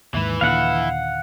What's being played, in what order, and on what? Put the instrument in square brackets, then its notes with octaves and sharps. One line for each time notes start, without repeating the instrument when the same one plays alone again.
[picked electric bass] D#2 G#2 [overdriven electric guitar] E3 E4
[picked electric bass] D#2 A#2 D3 [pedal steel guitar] F5 F#5